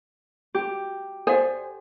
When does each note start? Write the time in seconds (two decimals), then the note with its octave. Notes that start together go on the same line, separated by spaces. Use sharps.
0.55 G4
1.27 A4 C5 D5 F#5 G#5